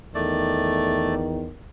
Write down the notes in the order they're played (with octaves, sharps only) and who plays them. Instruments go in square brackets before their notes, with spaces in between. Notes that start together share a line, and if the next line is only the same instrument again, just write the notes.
[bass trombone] E2 [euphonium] D#3 [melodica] A3 D5